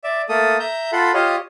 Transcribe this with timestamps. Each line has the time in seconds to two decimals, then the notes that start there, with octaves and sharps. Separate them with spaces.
0.04 D5 E5
0.29 A3 A#3 A4 D#6
0.60 E5 A#5 G6
0.92 F4 A4 F#5 B5 C6
1.14 F4 G4 C#5 D#5 F5